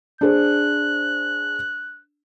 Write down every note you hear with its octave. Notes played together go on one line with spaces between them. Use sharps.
D4 G#4 C5 F#6